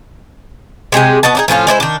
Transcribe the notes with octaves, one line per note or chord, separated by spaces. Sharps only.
C3 G#3 G4 G#4
B3 F#4 D#5 A5
D4 D#4 G#4
A2 F3 C#4 F4
G#3 D4 E4 C5
D#3 D4